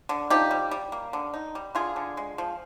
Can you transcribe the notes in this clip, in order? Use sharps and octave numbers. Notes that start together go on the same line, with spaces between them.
D3
F3 D#4 G4
G3
G3
A#3
D3
D#4
G3
D3 F4 G#4
D3
G#3
F3